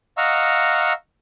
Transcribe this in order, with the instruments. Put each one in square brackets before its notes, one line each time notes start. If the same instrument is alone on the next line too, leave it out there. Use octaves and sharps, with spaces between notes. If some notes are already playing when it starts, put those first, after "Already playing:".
[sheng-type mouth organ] D#5 F5 F#5 A#5 C#6 E6